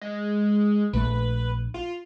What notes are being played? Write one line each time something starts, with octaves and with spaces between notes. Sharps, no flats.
G#3
A#1 A3 B4
F4